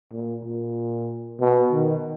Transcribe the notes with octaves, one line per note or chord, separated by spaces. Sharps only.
A#2
A#2
B2
D#3